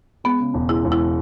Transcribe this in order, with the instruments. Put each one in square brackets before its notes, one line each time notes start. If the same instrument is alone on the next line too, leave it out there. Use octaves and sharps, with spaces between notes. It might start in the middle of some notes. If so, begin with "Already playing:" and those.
[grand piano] G#3 [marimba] B3
[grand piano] C#3
E1
[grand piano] G#3 [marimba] E4
[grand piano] E1
[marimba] E4